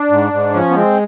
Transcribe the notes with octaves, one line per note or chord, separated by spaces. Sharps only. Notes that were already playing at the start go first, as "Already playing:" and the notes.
Already playing: D4
G#2
G#2
F3 C#4
B3
G#3 C4